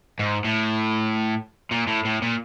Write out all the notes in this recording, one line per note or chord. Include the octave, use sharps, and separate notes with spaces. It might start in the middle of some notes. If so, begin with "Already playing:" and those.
G#2
A2
A#2
A2
A2
A#2